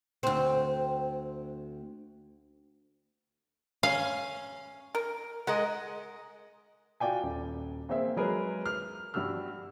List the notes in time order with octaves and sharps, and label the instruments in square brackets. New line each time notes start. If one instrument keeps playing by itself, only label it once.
[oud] D2 C4
[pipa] C#4 [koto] F5
[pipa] A#4
[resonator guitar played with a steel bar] G#3 A#4 D#5 [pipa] F#5
[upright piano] F4 F#4 D5 G5 G#5
D#1
A#3 C4 G#4 C5 E5
F#3 G#3 G#4 A#4 B4
F6
G2 G3 D4 F#4 E6 F6